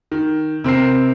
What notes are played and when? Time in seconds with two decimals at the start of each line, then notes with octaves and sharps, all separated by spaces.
0.12 D#3
0.64 C3 C4 A#4 C7